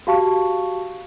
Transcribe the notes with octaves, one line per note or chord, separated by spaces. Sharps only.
F#4 G4 F5 A5 C#6